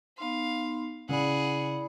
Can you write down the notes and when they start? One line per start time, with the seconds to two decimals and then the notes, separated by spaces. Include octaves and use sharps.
0.18 B3 D#4 F5 C6
1.09 C#3 E4 G#4 D5 F#5 B5